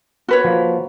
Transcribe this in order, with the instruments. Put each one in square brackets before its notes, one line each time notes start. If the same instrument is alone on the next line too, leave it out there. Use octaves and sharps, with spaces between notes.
[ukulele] F#4 B4 C#5
[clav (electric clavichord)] F3 A#3